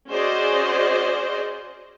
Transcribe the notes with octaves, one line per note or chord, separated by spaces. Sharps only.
C#4 F#4 G#4 C5 D5 D#5